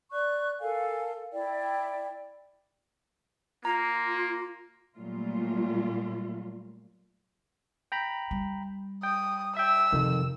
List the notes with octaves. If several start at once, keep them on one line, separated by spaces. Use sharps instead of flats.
D5 C#6 F#6
A4 A#4 F5 G#5
E4 D5 G5
A#3 F4 A#5
A#2 F#3 G3 A3 F4
G5 A#5 B5
G3
G5 D#6
E5 G5 E6
F2 C3 D#3